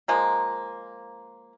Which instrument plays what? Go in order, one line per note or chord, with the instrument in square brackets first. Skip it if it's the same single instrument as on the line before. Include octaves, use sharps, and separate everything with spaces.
[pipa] F3 G#3 A#3